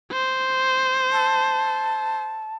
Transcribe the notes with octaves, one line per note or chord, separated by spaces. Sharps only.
C5
A5